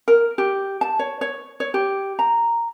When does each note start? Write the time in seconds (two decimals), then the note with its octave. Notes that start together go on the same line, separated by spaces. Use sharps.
0.08 A#4
0.38 G4
0.81 A5
0.99 C#5
1.21 C#5
1.60 C#5
1.74 G4
2.19 A#5